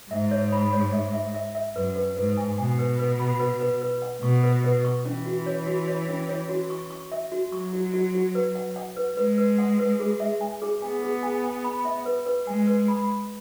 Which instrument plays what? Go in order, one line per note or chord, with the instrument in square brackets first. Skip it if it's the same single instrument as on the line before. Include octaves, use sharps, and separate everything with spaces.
[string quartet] G#2 [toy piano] E5
[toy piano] C#5
B5
C#5
E5
E5
E5
E5
[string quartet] F#2 [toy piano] B4
[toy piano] B4
[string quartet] G#2 [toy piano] B4
[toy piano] G#5
[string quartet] B2 [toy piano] G#5
[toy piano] B4
B4
B5
B4
B4
B4
F#5
[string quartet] B2 [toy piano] C#6
[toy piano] B4
B4
C#6
[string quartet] E3 [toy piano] C#4
[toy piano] F#4
C#5
F#4
C#5
C#4
C#5
F#4
C#6
C#6
E5
F#4
[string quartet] F#3 [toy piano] C#6
[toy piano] F#4
F#4
F#4
B4
F#5
F#5
B4
[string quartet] G#3 [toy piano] B4
[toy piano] B4
F#5
B4
G#4
E5
G#5
G#4
[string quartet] B3 [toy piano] G#5
[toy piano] G#4
G#5
G#5
B5
E5
B4
B4
[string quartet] G#3 [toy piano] G#5
[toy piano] B4
B5